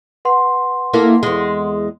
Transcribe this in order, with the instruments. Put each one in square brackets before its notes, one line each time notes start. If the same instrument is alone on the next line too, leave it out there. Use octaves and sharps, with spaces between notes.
[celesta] B4 F#5 C6
[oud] A#3 E4 A4
E2 G#3